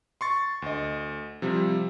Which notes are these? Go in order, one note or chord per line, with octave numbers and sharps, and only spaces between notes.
C6 C#6 A6
D2 D#5
C3 F3 G3